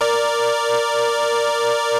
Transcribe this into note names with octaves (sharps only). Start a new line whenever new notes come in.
A#4 D5